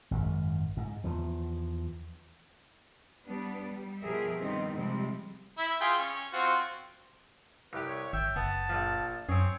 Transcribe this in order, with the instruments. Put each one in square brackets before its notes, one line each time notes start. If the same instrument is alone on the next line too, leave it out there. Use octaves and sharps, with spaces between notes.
[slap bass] G#1 F#2
G#2
E2 F3
[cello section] G3 B3 D4
G3
B2 F3 G4 G#4 A#4 E5
G2 D#3 B3 C4 D#4
C3 F3 G3 G#3 C4
[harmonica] E4 E5
F4 G#4 G5
C#4
C4 F4 F#4
[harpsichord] C2 G4 [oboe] B4
[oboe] C#5
[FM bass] G#1 [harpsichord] E5 [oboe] G5
[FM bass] F#1 [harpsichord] B3 [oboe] A5
[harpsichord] A#1 F3
[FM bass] F#2 [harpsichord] C4 G#4 [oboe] C#5